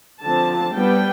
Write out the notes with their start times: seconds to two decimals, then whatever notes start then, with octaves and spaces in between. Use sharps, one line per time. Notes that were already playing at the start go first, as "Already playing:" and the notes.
0.21 D3 F3 C4 A5
0.73 G3 B3 D4 G5